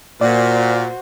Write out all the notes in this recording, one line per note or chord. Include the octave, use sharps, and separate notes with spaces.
A#2 F#4 C5 D5